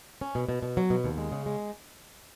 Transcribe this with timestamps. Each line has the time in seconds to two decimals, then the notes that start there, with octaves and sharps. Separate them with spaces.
0.21 C#4
0.35 B2
0.49 B2
0.63 B2
0.77 F#3
0.90 B2
1.04 D#2
1.18 G#3
1.32 C#3
1.46 G#3